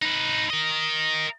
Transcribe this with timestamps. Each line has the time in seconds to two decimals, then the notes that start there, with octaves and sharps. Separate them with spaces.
0.02 D#4 B4
0.50 A#4 D#5